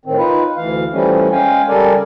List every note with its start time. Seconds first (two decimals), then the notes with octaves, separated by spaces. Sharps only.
0.06 A2 D#3 C4
0.18 D#4 F4 B4
0.57 D2 E3 F5
0.92 E3 F3 G3 A3 C#4
1.32 G#3 C#4 F5 G5 G#5
1.69 C#3 G3 A4 A#4 D5 G#5